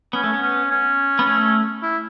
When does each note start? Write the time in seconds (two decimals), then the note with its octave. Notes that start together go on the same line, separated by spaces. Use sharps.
0.13 B3 C#4
0.24 A3
0.34 B3
0.42 C#4
0.71 C#4
1.19 B3
1.26 A3
1.82 E4